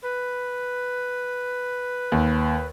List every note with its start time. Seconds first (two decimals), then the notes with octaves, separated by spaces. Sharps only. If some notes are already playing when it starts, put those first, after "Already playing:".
0.02 B4
2.12 D#2